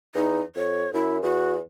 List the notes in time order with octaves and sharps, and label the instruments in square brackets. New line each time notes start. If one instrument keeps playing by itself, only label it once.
[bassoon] E2 [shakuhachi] D#4
[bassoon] F2 [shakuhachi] C#5
[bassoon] F#2 [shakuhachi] E4
[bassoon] E2 [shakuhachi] F#4